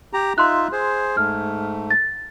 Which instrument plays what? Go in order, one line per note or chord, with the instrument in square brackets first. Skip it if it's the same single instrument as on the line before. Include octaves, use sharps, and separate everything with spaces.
[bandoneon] G4 A#5
[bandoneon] D#4 F4 E5 [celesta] C6 F#6
[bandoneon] G#4 C5
[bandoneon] G#2 A3 [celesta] F6
[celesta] A6